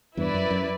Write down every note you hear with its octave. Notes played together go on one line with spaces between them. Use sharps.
E2 G2 E4 B4 D5
F#2
F#2